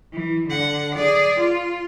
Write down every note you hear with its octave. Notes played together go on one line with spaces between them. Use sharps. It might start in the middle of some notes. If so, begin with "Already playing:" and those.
E3
D3 F#5
G#4 D5
F4